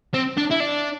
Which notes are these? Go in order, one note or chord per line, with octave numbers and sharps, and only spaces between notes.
C4
D4
E4
D4